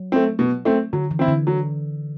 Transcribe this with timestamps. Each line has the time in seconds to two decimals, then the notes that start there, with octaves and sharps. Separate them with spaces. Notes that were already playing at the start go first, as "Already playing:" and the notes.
Already playing: F#3
0.12 A3 C4
0.39 B2
0.65 A3 C4
0.93 D3 F#3
1.11 E3
1.19 C4 E4
1.28 D3
1.47 F#3